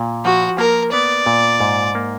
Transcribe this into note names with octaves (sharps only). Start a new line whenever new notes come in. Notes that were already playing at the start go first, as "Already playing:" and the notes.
Already playing: A#2
F3 F#4
A#3 A#4
B3 D5
A#2
G#2
A#3